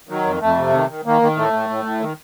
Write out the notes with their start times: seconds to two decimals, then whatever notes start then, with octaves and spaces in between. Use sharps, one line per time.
0.09 D#3 F#3
0.25 F2
0.41 F2 A3
0.57 C3
0.73 D#3
0.89 D#3
1.05 D#3 A#3
1.22 D#3
1.37 A2 A3
1.53 A2
1.69 A2
1.85 A2
2.01 D#3